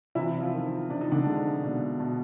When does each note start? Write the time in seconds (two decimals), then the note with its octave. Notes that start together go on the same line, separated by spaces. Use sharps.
0.15 C3 E3 E4
0.40 F3 F4
0.53 D#3
0.89 C3 D4
1.01 D#4
1.12 D3 D4
1.26 G#3
1.63 B2
2.00 B2